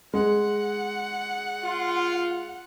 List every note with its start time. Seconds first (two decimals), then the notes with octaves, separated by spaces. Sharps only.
0.14 G#3 F#5
1.64 F4